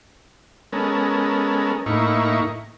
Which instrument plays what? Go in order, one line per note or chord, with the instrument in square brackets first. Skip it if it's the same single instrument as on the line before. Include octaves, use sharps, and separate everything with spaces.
[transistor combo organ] G#3 B3 C#4 A4 A#4
A2 A#3 D#4 E4 C#6